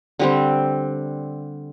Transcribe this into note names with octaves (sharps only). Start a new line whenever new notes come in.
D3 G3 C4